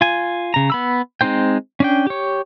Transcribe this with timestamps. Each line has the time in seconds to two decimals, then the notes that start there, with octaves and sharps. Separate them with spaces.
0.01 F4 G#5
0.54 C#3 A#5
0.70 B3 B5 E6
1.21 G#3 C4 D#4 C5 G5
1.80 C#4 D4 G5
2.07 G4 C#5